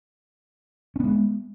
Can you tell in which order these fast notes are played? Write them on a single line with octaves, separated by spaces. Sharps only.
C#4 B3 G#3